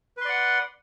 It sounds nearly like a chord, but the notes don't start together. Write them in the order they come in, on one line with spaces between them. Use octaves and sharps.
B4 C6 D5 F#5